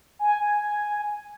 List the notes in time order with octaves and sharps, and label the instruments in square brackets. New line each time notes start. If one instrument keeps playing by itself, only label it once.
[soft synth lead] G#5